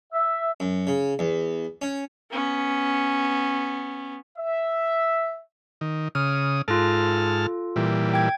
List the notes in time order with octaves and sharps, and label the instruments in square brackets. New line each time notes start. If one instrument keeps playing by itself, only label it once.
[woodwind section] E5
[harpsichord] F#2
C#3
E2
C#4
[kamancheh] B3 C#4
[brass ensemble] E5
[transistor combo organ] D#3
[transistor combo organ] C#3 D#6 [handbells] F6
[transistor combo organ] G#2 A5 F6 [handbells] F4 A4
[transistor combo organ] A#2 E3 G3
[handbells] G5 G#6